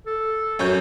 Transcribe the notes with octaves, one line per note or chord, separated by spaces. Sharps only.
A4
F#2 C#5 G6